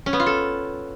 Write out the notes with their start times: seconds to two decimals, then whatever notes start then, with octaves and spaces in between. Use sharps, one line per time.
0.06 C#4
0.13 B3
0.20 F4
0.26 A4